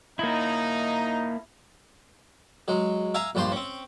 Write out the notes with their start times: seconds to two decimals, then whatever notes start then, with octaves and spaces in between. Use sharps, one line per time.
0.19 A#3 D#4 E4
2.68 F#3 G#3
3.14 E5 F5 G#5 A#5
3.35 A#1 G2 F3 C5 C6
3.52 C4 C#4